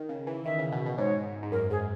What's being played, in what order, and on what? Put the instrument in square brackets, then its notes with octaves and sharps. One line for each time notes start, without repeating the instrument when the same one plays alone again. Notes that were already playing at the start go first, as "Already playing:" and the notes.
Already playing: [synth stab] D#3
C#3
E3
[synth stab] D#3 [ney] E5
[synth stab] C#3
B2
B2
[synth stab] G#2 [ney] C#5
[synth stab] G#2
[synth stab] F#2 [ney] A#4
[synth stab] G#2 [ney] G#4